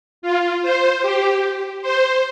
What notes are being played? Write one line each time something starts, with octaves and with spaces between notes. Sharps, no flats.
F4
C5
G4
C5